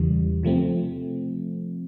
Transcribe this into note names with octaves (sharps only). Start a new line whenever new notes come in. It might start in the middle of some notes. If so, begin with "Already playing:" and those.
Already playing: E2 C#3 E3 G3
C3 F3 A3 C4